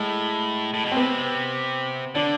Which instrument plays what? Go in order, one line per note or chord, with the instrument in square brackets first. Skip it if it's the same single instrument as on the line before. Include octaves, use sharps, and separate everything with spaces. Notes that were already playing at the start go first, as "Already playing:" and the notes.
Already playing: [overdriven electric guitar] A2 [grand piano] G#3
[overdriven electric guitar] A2
B2
[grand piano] C4
[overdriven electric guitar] C3 [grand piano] B3
[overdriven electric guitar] D3 [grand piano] D4